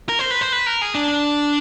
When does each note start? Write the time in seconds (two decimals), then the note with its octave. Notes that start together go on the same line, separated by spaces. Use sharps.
0.09 A#4
0.19 C5
0.31 B4
0.41 C5
0.52 B4
0.66 A#4
0.81 G#4
0.95 D4